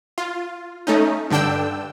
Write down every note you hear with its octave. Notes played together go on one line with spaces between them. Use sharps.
F4
A3 C#4 D#4
G2 D3 D4 G5 E6